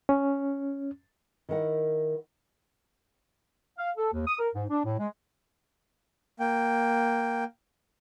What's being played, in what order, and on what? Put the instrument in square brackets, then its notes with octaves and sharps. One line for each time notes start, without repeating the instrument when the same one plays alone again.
[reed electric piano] C#4
[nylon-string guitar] D#3 E4 A#4 F#5
[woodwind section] F5
A4
D#2
D#6
A#4
G#2
D4
A2
G#3
[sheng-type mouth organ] A#3 G5